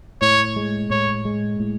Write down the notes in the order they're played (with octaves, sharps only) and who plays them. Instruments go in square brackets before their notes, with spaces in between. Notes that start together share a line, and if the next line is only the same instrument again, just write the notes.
[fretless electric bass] A2 [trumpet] C#5
[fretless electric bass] G#3
[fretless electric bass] A2 [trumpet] C#5
[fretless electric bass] G#3
A2